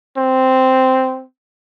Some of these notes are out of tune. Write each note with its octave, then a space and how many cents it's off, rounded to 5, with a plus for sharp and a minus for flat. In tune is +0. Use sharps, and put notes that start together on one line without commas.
C4 -5